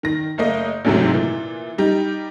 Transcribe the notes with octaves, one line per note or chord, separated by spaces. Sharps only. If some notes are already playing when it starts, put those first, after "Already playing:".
D#3 A#6
F#1 A3 A#3 D#5
A1 D2 G#2 C3 F#3
A#2 E3
G3 D#4 G4